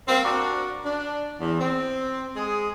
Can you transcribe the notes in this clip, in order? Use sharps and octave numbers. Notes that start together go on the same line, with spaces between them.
G3 A#3 C4
D4 F#4 A#4 D5
D4
E2
C4
G#3 G#4